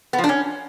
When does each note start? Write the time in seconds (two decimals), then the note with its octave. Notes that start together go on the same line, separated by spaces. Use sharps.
0.13 B3
0.18 F3
0.24 D4
0.29 C#4